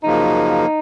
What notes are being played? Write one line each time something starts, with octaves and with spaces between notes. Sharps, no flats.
F#2 C#3 F3 A#3 D#4